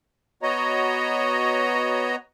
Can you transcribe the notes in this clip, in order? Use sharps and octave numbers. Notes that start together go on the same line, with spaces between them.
B3 F#4 C#5 D#5 A#5